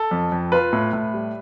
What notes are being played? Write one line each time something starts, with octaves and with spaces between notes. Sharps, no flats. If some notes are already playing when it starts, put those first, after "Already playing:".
Already playing: A4
F2
F2
F4 B4
A2
A2
G3